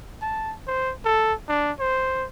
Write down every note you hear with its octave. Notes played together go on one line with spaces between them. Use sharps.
A5
C5
A4
D4
C5